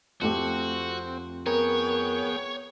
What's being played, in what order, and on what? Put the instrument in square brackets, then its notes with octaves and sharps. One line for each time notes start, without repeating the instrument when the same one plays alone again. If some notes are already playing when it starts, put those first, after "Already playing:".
[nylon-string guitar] F2 A3 G4 [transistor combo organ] C4 [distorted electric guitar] F#4
[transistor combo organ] B3 G#4 G5 [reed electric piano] A#4 [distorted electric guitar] C#5